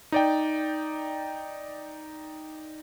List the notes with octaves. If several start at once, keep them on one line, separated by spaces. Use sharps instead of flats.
D#4 D5 G5